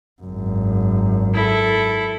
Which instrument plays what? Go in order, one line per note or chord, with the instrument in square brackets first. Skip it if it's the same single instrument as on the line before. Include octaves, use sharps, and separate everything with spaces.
[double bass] G#1 F#2
[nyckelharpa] E4 A4